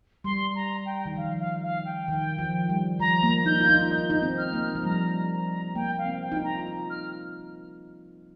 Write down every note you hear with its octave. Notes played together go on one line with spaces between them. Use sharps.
G3 C6
A#5
G5
D#3
F3 F5
F5
F5
G5
D#3
F3
G3
F3 A#5
A#3
D#4 G6
F4
D#4
D#4 G6
D#4
C4
F6
A#3
F3
G3 A#5
A#5
A#3 G5
F5
C4
G5
D#4
F4
A#5
F4
F6